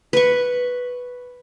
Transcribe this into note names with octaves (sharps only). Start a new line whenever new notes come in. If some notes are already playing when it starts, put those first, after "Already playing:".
B4 C#6